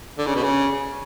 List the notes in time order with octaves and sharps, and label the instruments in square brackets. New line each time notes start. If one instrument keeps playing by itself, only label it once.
[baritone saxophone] D3
C#3
B2
C#3